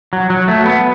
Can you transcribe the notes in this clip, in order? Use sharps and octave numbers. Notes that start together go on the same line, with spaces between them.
F#3
F#3
A3
B3